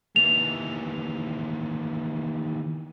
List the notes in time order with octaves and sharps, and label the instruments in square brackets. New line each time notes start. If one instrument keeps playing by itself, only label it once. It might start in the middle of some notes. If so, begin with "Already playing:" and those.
[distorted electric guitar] D#2 E3 [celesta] F7